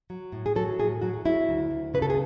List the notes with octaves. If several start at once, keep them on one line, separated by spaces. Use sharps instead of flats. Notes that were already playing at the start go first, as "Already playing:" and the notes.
F#3
A2
G#4
F#3 A4
A2 G#4
F#3 F#4
F#3 E4
D2
D2
C#3 B4
A4
G#4